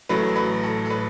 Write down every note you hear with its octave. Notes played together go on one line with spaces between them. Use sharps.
A1 A2 F#3 A3 B4
B4
A4
A4
B4